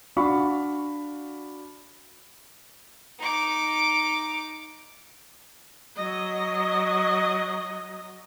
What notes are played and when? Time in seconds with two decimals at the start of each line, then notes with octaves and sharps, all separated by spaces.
0.17 D4 F#4 F5 B5 C#6
3.19 D#4 D6
5.97 F#3 D#5